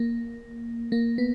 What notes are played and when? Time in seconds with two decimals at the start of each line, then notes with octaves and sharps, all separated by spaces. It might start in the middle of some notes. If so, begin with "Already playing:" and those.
Already playing: A#3
0.92 A#3
1.18 B3